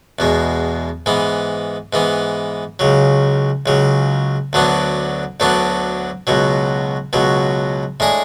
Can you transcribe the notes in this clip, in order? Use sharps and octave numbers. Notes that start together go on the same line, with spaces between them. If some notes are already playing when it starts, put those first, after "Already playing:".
E2 B2 G#3
G#2 E3 B3
G#2 E3 B3
C#2 C#3 F#3
C#2 C#3 F#3
D2 D3 F#3 B3 D4
D2 D3 F#3 B3 D4
C#2 B2 F#3
C#2 B2 F#3
A2 G#3 D4 G#4